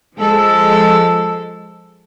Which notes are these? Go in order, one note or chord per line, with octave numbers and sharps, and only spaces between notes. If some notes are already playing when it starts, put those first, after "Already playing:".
F3 G#3 A4